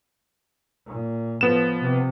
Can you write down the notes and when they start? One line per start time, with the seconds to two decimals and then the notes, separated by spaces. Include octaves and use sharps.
0.86 A#2
1.41 A2 F3 B3 E7
1.80 C3